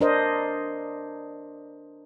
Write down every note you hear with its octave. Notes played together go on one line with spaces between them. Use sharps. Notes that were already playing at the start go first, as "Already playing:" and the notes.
D4 A#4 C5 D#5